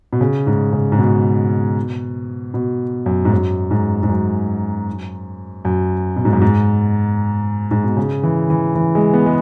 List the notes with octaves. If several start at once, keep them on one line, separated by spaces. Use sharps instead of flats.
B2
C#3
G#2
C#3
G#2
B2
B2
F#2
G#2
F#2
G#2
G#2
F#2
F#2
B2
G#2
F#2
G#2
G#2
B2
C#3
E3
E3
E3
G#3
B3
G#3